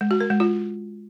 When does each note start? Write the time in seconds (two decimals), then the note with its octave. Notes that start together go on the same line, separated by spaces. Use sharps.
0.01 G#3
0.11 F#4
0.20 A#4
0.30 G#3
0.40 F4